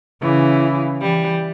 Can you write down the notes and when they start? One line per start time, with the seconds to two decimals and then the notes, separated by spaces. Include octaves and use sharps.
0.22 C#3 E3
1.01 E3 G3